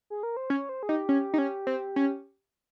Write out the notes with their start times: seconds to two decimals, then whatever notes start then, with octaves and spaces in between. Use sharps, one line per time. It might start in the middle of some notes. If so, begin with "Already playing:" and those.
0.10 G#4
0.23 A#4
0.37 C5
0.50 C#4 C#5
0.69 C5
0.83 G#4
0.89 D#4 G4
1.09 C#4
1.34 D#4
1.38 C#4
1.67 C4
1.96 C#4